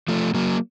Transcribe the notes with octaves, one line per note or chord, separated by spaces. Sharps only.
F3 A3
F#3 A#3